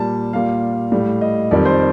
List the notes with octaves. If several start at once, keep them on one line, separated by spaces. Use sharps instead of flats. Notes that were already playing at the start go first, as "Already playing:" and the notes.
Already playing: A#2 G3 A5
A#2 G3 F5
A2 G3
D#5
F2 D#3 G3 D5
C5